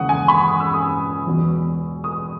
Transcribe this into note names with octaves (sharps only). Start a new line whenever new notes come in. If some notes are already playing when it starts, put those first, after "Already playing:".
Already playing: E1 D#2 C#3 E3 F#5 D#6
G#5
B5
D#6
E6
D#6
E1 E2 B2 F#3
D#6